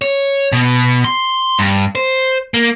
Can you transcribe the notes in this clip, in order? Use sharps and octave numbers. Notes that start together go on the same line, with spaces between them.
C#5
B2
C6
G2
C5
A#3